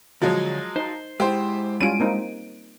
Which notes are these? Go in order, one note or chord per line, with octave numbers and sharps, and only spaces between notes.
D3 F3 F#3 G#3 C#5
D#4 C5
G#3 E4 G4 C5
G3 C#4 F4 D7 D#7
A#3 C4 D#4